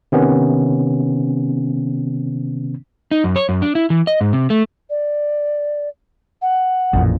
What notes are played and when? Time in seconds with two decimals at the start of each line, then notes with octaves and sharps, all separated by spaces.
0.12 C3 D#3 B3 C#4
3.11 D#4
3.24 F#2
3.36 C#5
3.49 F#2
3.62 D4
3.75 E4
3.90 E3
4.07 D#5
4.21 G#2
4.33 C3
4.50 A3
4.90 D5
6.42 F#5
6.93 A1 F2 A#2